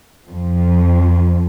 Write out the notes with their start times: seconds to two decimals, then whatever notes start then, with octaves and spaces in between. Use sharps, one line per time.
0.28 F2 F3